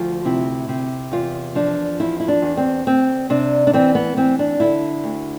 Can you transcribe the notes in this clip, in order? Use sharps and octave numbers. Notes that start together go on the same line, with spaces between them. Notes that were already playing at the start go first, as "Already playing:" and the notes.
Already playing: D2 F3 F4
C3 E4
C3
E2 F4
F3 D4
E2 E4
E4
D4
E2
C4
D2 C4
C3 D4
D4
E3 C4
B3
E3 C4
D4
D3 E4
D2